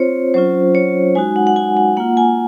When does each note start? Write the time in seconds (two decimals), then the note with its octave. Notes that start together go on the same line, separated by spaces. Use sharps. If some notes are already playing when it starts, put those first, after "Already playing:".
Already playing: C4 F4 C5 C#5
0.34 F#3 C#4 F4 C5
0.75 C#5
1.15 G#3 D#4 F#4 G#5
1.36 F#5
1.47 F#5
1.56 G#5
1.77 F#5
1.97 A#3 F4 F#5
2.17 G#5